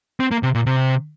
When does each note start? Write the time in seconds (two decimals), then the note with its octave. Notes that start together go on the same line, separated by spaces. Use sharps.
0.20 C4
0.31 A#3
0.43 C3
0.55 A#2
0.66 C3